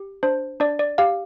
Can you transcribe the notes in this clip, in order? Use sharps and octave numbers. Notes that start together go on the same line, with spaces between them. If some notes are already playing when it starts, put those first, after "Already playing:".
Already playing: G4
D4 C5
D4 D5
D5
G4 F5